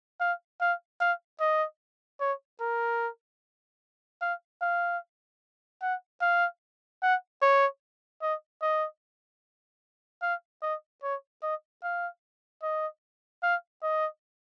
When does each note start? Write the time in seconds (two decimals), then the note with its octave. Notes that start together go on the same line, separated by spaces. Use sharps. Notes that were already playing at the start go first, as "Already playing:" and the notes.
0.20 F5
0.61 F5
1.01 F5
1.40 D#5
2.20 C#5
2.60 A#4
4.22 F5
4.62 F5
5.82 F#5
6.22 F5
7.02 F#5
7.42 C#5
8.22 D#5
8.62 D#5
10.22 F5
10.62 D#5
11.03 C#5
11.43 D#5
11.83 F5
12.63 D#5
13.43 F5
13.83 D#5